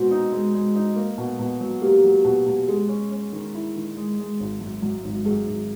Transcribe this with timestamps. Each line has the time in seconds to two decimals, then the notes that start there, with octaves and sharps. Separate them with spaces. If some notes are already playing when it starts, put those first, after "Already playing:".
Already playing: B2 G#3 C4 F#4
0.11 D#4
0.32 G#3
0.54 G#3
0.76 D#4
0.96 A#3
1.18 B2
1.39 B2
1.60 F#3
1.82 A#3 G4
2.04 F#3
2.24 B2
2.47 B2
2.68 G#3 G#4
2.89 C#4
3.11 C#4
3.33 D#3
3.54 E4
3.76 D#3
3.97 G#3
4.18 G#3
4.40 G#1
4.60 F#2
4.82 F#2
5.04 G#1
5.25 F#2 G#4
5.46 G#1